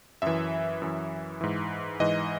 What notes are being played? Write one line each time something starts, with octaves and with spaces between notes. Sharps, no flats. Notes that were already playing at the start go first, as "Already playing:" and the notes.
F#2 E3 E5
F#2 E3
G#2 E3
G#2 E3 D#5